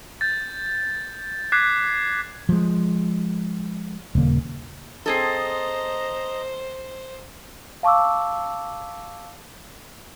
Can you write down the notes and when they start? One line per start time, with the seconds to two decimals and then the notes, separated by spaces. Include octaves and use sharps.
0.21 G6 A6
1.52 D6 F#6 G#6 B6 C7
2.49 F3 G#3
4.15 D#1 C#3 A#3
5.06 C4 G#4 A4 C5 D#5 A#5
7.83 F5 A5 C#6 D6 E6